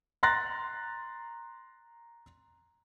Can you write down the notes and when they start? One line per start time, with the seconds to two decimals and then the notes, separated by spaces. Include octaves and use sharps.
0.23 A#5 C6 F#6 A6 A#6